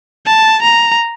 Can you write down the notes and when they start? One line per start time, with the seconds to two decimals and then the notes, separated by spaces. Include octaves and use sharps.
0.26 A5
0.62 A#5